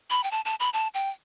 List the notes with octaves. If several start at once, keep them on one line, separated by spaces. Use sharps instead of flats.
B5
G5
A5
A5
B5
A5
G5